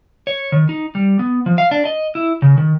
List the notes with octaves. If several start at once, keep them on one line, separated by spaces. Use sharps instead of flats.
C#5
D#3
D#4
G3
B3
F3
F5
D4
D#5
E4
C#3
D#3